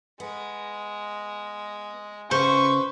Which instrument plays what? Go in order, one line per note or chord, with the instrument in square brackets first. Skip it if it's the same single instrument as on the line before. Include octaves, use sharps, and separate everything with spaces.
[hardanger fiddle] G#3 [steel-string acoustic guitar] B3
[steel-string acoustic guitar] C#3 C#4 [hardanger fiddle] B4 [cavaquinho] C5 [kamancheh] C#6